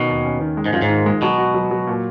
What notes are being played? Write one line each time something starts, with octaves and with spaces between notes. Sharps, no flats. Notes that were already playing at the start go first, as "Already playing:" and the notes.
Already playing: B2 D#3 C#4
D#2
C#4
D#3
G#3
G#2
F#2 F4
G#2
D#3
G#3
B2 F#3
F#4
F#3
F#3
A#2